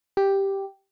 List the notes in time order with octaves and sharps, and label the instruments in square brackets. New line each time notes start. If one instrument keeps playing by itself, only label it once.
[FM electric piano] G4